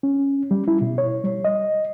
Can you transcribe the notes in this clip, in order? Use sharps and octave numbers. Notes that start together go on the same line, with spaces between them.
C#4
G3
E4
B2
C#5
G3
D#5